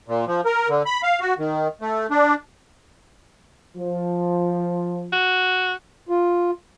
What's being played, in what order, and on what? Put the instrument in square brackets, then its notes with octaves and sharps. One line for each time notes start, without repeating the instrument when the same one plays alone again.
[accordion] A#2
F3
A#4
D3
B5
F5
F#4
D#3
A3
D4
[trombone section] F3
[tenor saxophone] F#4
[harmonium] F4